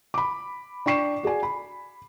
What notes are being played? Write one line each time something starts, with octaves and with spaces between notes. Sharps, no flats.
B5 D6
D4 G5 C#6 C7 E7
F#4 G#4 D5 G#5
B5